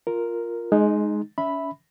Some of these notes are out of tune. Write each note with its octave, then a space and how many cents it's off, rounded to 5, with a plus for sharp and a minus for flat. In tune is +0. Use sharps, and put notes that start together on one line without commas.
F4 +0 A#4 +0
G#3 +15 D#4 -10
C#4 +35 E5 -10 B5 +0